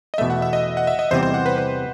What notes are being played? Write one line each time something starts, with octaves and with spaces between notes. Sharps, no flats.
D#5
E2 B2 A3 E5
F#5
E5
D#5
F#5
E5
D#5
E2 C3 E3 G3 C4 C5
C5
F#5
B4
B4